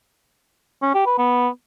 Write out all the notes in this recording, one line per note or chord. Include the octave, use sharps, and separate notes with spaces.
C#4
G4
B4
B3